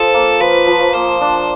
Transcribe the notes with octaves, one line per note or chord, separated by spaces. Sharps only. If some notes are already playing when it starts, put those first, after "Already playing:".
Already playing: F3 A4
A#3
F3 B4
F3
A#3 C5
D4